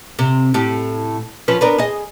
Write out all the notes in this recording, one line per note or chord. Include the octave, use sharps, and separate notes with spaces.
C3
A2 G4
F3 C#4 B4
B3 D4 A#4
G#4 D#5